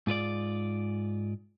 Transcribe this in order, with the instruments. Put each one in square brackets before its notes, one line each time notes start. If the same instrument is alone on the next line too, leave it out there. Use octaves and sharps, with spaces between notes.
[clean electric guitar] G#2 F4 B4 D5